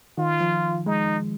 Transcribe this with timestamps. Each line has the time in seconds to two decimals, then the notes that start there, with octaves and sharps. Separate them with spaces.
0.18 D#3 F4
0.41 F3
0.86 G#3 D#4